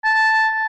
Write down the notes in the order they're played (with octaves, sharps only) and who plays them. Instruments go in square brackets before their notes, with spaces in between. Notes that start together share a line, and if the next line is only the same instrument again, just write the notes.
[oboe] A5